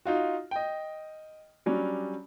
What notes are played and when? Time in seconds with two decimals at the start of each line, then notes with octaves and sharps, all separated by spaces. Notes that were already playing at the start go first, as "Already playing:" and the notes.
0.05 D#4 F4 F#4
0.51 D#5 G5
1.66 F#3 G3 C#4 D4